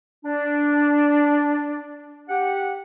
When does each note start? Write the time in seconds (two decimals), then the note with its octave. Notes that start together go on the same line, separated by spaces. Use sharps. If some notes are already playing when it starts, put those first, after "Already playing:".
0.24 D4
2.29 G4 F#5